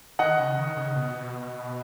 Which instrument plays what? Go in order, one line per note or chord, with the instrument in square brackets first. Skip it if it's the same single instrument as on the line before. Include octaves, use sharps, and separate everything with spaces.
[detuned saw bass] D#3 [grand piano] D#5 F#5
[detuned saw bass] C#3
D#3
C#3
B2